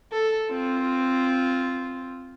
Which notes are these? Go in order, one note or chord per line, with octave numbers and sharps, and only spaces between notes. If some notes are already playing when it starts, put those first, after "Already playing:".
A4
C4 F4